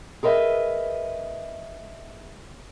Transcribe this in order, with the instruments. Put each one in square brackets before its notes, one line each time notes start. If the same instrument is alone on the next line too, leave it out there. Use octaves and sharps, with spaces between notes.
[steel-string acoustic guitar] G#4 A#4 B4 D#5 E5